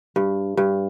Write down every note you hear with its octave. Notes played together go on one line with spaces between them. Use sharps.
G2
G2